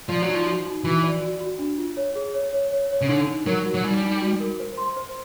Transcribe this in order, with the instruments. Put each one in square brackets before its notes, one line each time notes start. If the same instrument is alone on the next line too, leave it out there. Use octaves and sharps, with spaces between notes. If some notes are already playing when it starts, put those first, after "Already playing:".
[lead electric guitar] F3 [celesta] D5
[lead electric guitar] F#3
[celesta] D#4
[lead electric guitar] F3
[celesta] F#4
D#4
[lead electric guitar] E3 [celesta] F#4
[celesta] D5
F#4
F#4
D4
F4
C#5
G#4
C#5
C#5
C#5
C#5
[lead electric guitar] C#3
[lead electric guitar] D3 [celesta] D#4
[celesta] D#4
[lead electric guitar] F#3 [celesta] A#4
[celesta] F#4
[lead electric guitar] F#3
[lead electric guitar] G3 [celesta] D#4
[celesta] D#4
F#4
A#4
C5
C6
C5